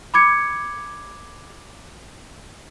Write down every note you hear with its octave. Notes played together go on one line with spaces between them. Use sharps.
B5 D6 G#6 C#7